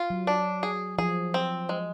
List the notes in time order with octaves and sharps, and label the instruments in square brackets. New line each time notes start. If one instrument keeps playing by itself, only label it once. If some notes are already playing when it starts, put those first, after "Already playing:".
Already playing: [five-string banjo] F4
[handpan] F#3
[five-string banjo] D4
G#4
[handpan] F3 [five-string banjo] G#4
[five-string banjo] C4
G#3